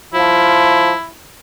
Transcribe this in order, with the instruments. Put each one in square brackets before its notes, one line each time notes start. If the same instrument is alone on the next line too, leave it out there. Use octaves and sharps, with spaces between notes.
[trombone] F3 [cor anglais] E4